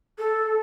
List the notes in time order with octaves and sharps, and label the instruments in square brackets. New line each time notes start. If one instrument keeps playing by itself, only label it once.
[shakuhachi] A4